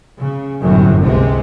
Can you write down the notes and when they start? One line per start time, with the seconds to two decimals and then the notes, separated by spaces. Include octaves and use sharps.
0.18 C#3
0.63 G1 F#2 A2 C3
1.01 C#2 C3 G#3